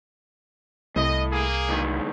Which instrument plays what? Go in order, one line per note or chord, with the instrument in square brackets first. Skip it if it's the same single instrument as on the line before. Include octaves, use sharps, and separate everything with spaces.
[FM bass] C2 [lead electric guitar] A2 [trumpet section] D#5
[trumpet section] A#3 G#4
[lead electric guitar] C#2 D#3